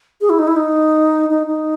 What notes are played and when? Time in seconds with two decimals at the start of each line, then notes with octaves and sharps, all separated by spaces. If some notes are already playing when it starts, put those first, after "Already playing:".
0.21 G#4
0.30 E4
0.39 D#4
0.47 E4
0.56 D#4
1.29 D#4
1.47 D#4